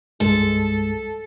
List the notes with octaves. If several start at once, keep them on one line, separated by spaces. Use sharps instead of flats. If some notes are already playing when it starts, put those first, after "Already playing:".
C2 G2 G#3 A4